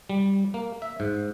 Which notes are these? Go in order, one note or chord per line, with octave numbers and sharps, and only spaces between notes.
G3
A#3
E5
G#2